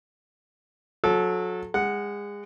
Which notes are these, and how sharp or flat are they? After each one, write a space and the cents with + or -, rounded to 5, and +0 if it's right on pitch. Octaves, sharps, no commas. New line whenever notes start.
F#3 -30 A4 -20
G#3 -25 F#5 +0